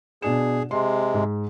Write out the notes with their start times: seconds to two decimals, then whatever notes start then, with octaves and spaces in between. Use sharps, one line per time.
0.22 B2 D4 G#4 E7
0.71 C3 G#3 C6
1.14 G#2